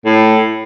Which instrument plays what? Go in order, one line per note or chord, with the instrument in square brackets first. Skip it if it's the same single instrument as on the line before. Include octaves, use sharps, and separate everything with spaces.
[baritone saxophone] A2